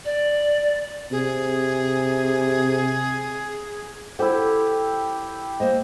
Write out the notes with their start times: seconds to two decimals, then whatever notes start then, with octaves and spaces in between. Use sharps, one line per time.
0.05 D5
1.12 C3 G#4
4.19 E4 G4 A4 C5 F#5
5.60 A#3 C5 D#5